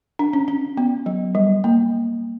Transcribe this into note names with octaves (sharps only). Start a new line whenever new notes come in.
D4
C#4
C#4
B3
F#3
G3
A#3